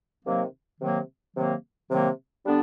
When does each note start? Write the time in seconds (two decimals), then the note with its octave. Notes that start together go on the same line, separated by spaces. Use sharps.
0.25 C3 D#3 F#3 A#3
0.79 C3 D#3 F#3 A#3
1.34 C3 D#3 F#3 A#3
1.90 C3 D#3 F#3 A#3
2.44 D3 G3 B3 D4